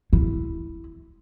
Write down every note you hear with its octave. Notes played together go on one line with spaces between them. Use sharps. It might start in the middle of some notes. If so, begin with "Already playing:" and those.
E4